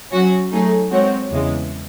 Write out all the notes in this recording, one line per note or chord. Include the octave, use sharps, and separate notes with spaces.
F#3 C#4 F#4
F#3 A3 D#4 G#4
G#3 C4 F#4 C#5
E2 C#3 E3 G#3